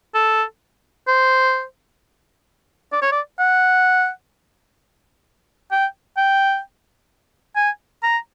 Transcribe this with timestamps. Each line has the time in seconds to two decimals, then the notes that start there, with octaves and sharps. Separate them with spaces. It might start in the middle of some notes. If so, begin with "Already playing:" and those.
0.15 A4
1.08 C5
2.93 D5
3.02 C#5
3.12 D5
3.39 F#5
5.72 G5
6.17 G5
7.56 G#5
8.03 A#5